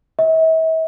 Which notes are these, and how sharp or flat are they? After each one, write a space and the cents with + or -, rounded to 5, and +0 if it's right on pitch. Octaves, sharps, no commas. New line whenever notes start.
E5 -40